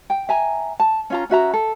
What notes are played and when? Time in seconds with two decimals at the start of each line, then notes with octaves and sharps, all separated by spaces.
0.10 G5
0.29 E5 G#5 A#5
0.80 A5
1.10 C#4 F4 A#5
1.30 C#4 F#4 E5 A#5
1.54 A4